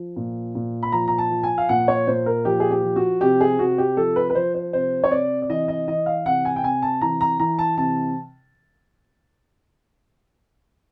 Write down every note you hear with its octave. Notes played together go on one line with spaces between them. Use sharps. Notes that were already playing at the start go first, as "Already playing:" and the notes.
Already playing: F3
A#2
A#2
B5
F3 A#5
A#5
A5
F3
G#5
F5
A#2 F#5
C#5
A#2 C5
A#4
F3 G4
G#4
G4
F3
F#4
C3 G4
G#4
C3 F#4
G4
F3 A4
B4
B4
F3 C5
C5
C3 C5
C#5
C3 D5
D5
E3 D#5
D#5
E3 D#5
F5
C3 F#5
G#5
G5
C3 G#5
A5
E3 A#5
A#5
E3 A#5
A5
C3 A5